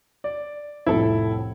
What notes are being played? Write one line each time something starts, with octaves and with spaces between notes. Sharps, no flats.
D5
C2 F2 A2 E4 A4